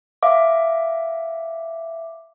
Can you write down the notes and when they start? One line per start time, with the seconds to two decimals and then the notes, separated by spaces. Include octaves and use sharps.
0.23 E5 F5 D6